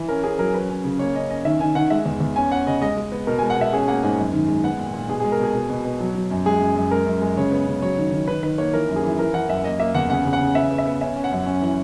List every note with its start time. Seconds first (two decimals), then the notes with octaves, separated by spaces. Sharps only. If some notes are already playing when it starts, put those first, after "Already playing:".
Already playing: E3
0.09 C#4 A#4
0.24 C#4 G#4
0.39 F#3 A#4
0.54 C#4 B4
0.69 C#4
0.84 C#3
0.99 A#3 C#5
1.15 C#4 D#5
1.30 C#4 D#5
1.45 D#3 E5
1.60 D#3 G#5
1.75 D#3 F#5
1.90 G#3 E5
2.06 E2
2.20 E2
2.36 C#4 G#5
2.51 C#4 F#5
2.67 C#3 D#5
2.82 G#3 D#5
2.97 G#3
3.12 B3
3.27 B2 A#4
3.39 G#3 G#5
3.50 F#5
3.57 B2 E5
3.73 C#4 G#4
3.88 A#3 F#5
4.03 G#2 G#5
4.18 F#2
4.33 D#3
4.48 G#3
4.64 B3 F#5
4.79 A#2
4.94 A#2
5.09 B2 G#4
5.20 G#3 G#4
5.32 A#4
5.39 B2 G#4
5.55 B2
5.70 B2
5.85 B2
6.00 F#3
6.15 F#3
6.31 F#2
6.46 G#3 G#4
6.61 F#2
6.76 F#2
6.91 G#3 A#4
7.06 F#2
7.21 G#3
7.37 C#3 C#5
7.52 B3
7.67 C#3
7.82 F#3 C#5
7.97 D#3
8.12 D#3
8.28 D#3 B4
8.43 D#3 B4
8.58 A#3 C#5
8.73 E3 A#4
8.89 F#2
8.96 G#4
9.04 E3
9.19 E3 A#4
9.34 E3 F#5
9.49 F#2 E5
9.64 A#3 D#5
9.80 A#3 E5
9.95 E2 F#5
10.10 C#3 F#5
10.25 C#3
10.33 F#5
10.40 C#3
10.55 B3 E5
10.71 B3
10.78 E5
10.86 B3
11.01 C#4 E5
11.16 C#4
11.24 F#5
11.31 F#2
11.46 C#4
11.62 E3